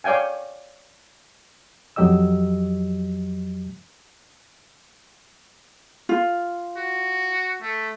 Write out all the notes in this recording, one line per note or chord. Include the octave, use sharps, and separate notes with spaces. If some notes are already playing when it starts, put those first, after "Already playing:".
C#5 D5 F5 G5 G#5
F2 F#3 G4 D#5 E6
F4
F#4
A3